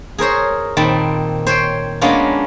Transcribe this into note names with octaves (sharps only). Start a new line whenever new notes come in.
G#4 A#4 C5 C#5
A#2 D#3 C4 A5 B5
C5 C#5 G5
G#3 A#3 B3 C#4 D4 F4